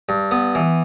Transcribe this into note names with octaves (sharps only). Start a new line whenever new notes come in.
G2
B3
E3